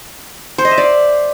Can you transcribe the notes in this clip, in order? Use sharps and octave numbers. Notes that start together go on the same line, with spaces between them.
C5
D#5
E5
D5